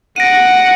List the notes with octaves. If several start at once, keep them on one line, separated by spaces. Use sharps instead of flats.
D#7
F#5 A#6 D7